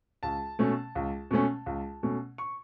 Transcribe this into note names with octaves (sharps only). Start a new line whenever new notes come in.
C#2 A5
B2 A3 C#4
C#2
B2 A3 C#4
C#2
B2 A3 C#4
C#6